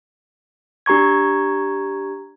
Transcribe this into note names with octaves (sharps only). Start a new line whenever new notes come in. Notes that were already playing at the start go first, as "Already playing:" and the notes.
D4 G4 A#5 C#6 G#6